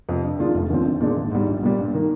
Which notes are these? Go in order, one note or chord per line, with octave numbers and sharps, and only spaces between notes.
F2 C3
G2
D#3 G#3 D4 F4
F1
D#2 D3 F3 C4
A#1
A#2 G#3 D4
G#1
G#2 G3
A#1
A#2 G3
G2
D#3 A#3